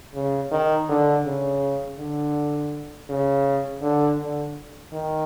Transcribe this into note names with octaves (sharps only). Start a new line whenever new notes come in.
C#3
D#3
D3
C#3
D3
C#3
D3
D3
D#3